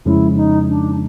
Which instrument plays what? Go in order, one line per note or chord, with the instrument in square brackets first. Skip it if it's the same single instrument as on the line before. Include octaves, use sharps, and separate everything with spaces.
[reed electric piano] F2 C#3 F3 G#3 C#4 [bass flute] E4
[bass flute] D#4
D4